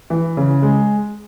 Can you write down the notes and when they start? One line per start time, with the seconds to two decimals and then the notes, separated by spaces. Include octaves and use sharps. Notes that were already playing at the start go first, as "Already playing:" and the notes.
0.10 E3
0.37 C#3
0.62 G#3